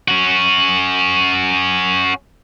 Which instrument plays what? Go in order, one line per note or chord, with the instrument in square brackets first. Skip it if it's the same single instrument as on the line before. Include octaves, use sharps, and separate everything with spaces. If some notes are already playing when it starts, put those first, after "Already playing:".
[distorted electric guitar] C#4 F#4